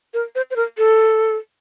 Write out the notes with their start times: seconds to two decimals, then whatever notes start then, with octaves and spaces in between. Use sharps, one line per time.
0.14 A#4
0.35 C5
0.51 C5
0.56 A#4
0.78 A4